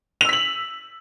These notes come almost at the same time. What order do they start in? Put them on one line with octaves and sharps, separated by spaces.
F7 E6 B6 F#7